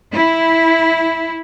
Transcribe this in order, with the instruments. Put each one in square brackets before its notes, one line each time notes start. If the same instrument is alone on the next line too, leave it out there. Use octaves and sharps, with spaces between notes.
[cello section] E4